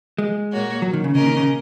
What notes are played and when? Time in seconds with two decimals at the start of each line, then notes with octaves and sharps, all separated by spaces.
0.18 G#3
0.51 A#2 A#3 F#4 C#5
0.82 F#3
0.93 D#3
1.04 C#3
1.15 A#2 C#3 A#3 C#4 A#4 D#5
1.26 D#3
1.37 C#3